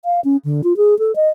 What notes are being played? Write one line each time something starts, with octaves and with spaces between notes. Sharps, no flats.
F5
C#4
D3
F4
G#4
A4
D#5